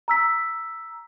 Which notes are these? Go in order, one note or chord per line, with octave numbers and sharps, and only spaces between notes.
A#5 E6 B6